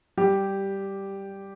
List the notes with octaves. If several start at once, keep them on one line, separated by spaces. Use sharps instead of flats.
G3 G4